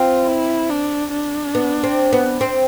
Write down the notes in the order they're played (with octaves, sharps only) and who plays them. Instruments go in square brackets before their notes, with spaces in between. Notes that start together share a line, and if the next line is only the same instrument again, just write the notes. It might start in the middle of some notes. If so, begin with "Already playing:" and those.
Already playing: [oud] C4 [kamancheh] F4
[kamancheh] E4
D4
D4
[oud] B3
C4
B3
C4